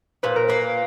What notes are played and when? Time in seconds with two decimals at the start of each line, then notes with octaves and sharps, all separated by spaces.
0.23 A#2 B4
0.36 A#4
0.48 A#3 B4